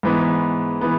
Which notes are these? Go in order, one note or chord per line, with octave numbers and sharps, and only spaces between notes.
G#2 E3 B3
E3 B3